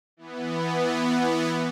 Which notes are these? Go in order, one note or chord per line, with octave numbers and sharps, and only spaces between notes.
E3 B3